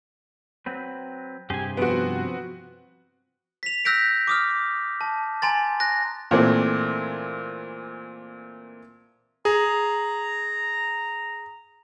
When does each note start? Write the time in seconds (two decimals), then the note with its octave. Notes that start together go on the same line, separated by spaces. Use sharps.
0.66 F#3 C4 B4
1.50 G2 C3 G4 G#4 G#5
1.77 F3 B3 C4 F#4
3.63 B6 F7
3.85 E6 F#6 G6 A#6 B6 D7
4.27 D6 D#6 F6
5.01 A5
5.42 G#5 A#5 C6 A6
5.80 F#6 A#6
6.31 A#2 E3 A3 C4
9.45 G#4 A#5